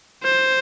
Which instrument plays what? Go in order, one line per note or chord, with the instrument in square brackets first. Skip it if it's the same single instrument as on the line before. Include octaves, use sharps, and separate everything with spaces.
[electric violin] C5